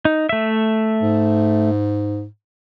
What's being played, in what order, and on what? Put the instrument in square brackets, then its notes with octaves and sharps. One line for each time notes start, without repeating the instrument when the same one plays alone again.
[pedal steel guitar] D#4
A3 E5
[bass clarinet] G#2